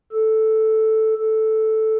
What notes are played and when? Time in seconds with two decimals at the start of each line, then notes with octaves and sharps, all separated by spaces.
0.12 A4
1.18 A4